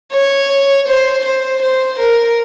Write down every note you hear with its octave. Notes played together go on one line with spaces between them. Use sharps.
C#5
C5
C5
C5
A#4